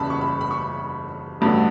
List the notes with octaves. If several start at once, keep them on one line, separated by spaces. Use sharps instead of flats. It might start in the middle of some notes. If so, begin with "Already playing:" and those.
Already playing: F#1 E2 C#3 G3 A5 B5
C#6
B5
B5
C#6
A1 G2 D3 F#3 A3